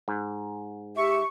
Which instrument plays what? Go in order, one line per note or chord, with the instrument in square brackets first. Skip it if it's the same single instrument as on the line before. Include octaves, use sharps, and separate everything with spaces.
[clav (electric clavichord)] G#2
[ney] G4 [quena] E5 [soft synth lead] C#6